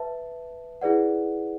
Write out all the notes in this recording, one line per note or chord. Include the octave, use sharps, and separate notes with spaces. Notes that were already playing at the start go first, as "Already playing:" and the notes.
Already playing: B4 E5 A5
E4 G#4 B4 D5 F#5